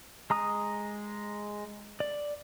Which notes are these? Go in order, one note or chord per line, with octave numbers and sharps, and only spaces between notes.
G#3 A#5 D#6
D5